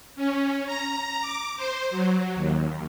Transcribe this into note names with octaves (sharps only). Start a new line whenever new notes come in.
C#4
A#5
D6
C5
F#3
D#2